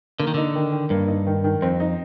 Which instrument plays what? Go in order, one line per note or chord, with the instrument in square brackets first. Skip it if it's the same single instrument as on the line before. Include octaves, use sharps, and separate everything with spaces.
[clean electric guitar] D3 [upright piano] A#3
[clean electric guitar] D#3
[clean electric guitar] D3 [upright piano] D#4
[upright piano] D#3
D#3
[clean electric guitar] G2 [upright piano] A#3
[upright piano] D#4
D#3
D#3
[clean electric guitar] F2 [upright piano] C4
[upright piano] D#4